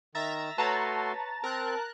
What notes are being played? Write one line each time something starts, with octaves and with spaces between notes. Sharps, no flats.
D#3 E5 A#5 A6
A3 F#4 B4 C#5 A5 A#5 C6 A6
C4 A#4 F#6